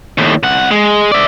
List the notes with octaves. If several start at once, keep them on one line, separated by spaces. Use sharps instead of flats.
D#2 A2
C2 F#5
G#3
D5 E5